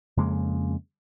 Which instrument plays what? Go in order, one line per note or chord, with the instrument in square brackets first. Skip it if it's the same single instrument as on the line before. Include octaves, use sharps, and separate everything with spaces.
[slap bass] F2 C#3 G#3 A#3